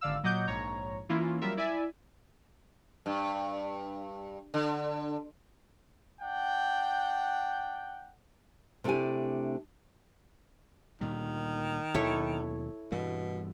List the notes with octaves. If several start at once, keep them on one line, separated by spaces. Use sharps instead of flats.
G#1 D3 D5 F5 E6
A#2 F#3 D#5 F#5 D6 G6
A#1 G#2 C#5 A#5
E3 A#3 C#4 E4 F4
F#3 G3 F4 A#4 E5
E4 D5 E5 G#5
G2
D3
D4 F#5 G5
C3 A3 D4 E4 G4 G#5
D2 A#2 D#3 G3
D#2 B2 F#3 E4 A4 C#5
G2 B2 E3 G3